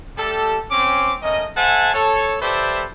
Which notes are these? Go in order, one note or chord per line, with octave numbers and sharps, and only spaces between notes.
G3 A3 G4 A4
C4 C#4 D6
A3 C#4 A#4 D#5
A4 C5 E5 F#5 G#5 A5
A4 C#5
G4 A4 B4 C5 D5 E5